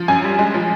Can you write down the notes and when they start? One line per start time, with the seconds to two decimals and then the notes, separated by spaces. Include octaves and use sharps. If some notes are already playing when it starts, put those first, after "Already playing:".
Already playing: F3
0.08 F#2 G#5
0.24 G3
0.39 G#3
0.54 F3